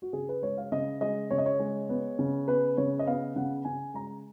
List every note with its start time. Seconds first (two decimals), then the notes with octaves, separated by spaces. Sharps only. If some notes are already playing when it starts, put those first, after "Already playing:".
0.02 F#4
0.13 C#3 G#4
0.29 B4
0.42 G#3 C#5
0.57 F5
0.72 C#3 D#5
1.01 G#3 D#5
1.30 C#3 C#5
1.38 D#5
1.46 C#5
1.59 G#3
1.89 B3
2.19 C#3
2.47 B3 B4
2.77 C#3 C#5
2.99 D#5
3.07 B3 F5
3.36 C#3 F#5
3.65 C#3 G#5
3.94 G#3 A#5